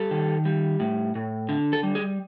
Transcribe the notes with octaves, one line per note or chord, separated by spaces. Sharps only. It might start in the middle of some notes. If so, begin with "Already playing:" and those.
Already playing: G3 A4
D#3
G3
A2
A2
D3
A4
G3
G#4